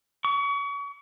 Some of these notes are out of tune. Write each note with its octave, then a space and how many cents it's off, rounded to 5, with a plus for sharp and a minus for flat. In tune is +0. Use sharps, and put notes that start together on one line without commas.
C#6 +35